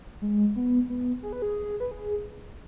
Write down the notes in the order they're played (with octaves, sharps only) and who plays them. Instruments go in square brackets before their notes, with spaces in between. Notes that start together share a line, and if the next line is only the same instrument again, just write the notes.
[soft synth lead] G#3
B3
B3
G#4
B4
G#4
B4
G#4